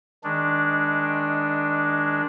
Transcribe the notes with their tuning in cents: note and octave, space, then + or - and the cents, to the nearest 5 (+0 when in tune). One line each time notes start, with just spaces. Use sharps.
D#3 +15 G#3 +0 D4 +0